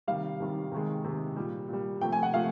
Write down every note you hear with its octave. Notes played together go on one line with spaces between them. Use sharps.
C3 D#3 G3 F5
C3 D#3 G3
C3 D#3 G#3
C3 D#3 G#3
A#2 G3
A#2 G3
C3 F3 A3 G5
G#5
F#5
C3 F3 A3 F5